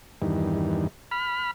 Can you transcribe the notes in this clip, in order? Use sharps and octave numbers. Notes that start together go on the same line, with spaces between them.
E2 G2 D#3
B5 F6